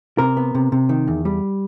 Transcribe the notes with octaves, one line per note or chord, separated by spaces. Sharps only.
C3 A#4
B3
C3
C3
D#3
E2
G3